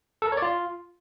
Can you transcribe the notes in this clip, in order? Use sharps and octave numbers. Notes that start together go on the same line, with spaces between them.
A4
A#4
C#5
D5
F4